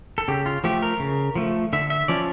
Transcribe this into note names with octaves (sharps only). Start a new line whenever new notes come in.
A4
C#3 G4
F4
F3 A3 G4
A#4
C#3
F3 A3
D3 E5
E5
F3 C#4 D5